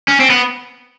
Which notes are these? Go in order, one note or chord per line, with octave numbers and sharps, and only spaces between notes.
C#4
C4
B3